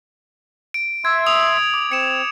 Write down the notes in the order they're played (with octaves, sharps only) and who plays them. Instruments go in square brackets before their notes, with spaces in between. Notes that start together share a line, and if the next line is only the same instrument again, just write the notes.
[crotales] D7
[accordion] E5 C6 [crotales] G#6
[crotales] D#6 F7
D6
[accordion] C4 [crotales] C#7 E7